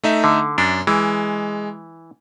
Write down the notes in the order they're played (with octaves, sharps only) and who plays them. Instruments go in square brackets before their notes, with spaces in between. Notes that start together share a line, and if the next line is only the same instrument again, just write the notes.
[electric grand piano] A3 D#4 E5
[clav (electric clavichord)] D3
[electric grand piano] F#2 [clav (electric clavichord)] D4
[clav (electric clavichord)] E3 [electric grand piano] G#3